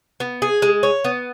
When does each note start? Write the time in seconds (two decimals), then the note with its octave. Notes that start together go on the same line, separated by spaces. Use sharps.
0.20 B3
0.42 G#4
0.62 G#3
0.83 C#5
1.04 B3